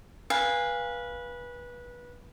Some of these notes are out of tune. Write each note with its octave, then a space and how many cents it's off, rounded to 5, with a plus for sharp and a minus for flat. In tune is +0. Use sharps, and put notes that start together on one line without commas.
B4 -20 F5 +0 G#5 -20